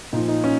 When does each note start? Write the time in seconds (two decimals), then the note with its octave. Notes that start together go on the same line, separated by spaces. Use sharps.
0.13 A#2 D#4
0.15 F3
0.28 D#4
0.44 C#4